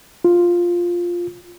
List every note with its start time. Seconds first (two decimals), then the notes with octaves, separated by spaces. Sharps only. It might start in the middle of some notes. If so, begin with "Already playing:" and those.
0.24 F4